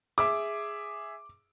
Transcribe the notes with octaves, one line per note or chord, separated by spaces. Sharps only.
G#4 E5 D6